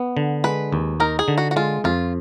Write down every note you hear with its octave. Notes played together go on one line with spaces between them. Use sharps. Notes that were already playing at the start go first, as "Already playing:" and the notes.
Already playing: B3
D3
G#3 B4
D#2
D#4 A#4
G#4
D3
F#4
F#4
G#3 F4
F2 F4